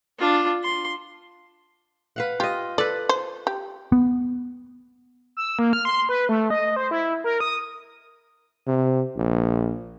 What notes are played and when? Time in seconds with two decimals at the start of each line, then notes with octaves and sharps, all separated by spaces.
0.19 D4 F4
0.64 C6
2.16 B4 F5 F#5
2.40 F4 G4 D#5
2.78 A4 B4 D5
3.09 C5
3.47 G4
3.92 B3
5.37 E6
5.59 A#3
5.73 F6
5.85 C6
6.09 B4
6.29 A3
6.50 D#5
6.76 C5
6.91 E4
7.24 A#4
7.40 D#6
8.67 C3
9.17 A#1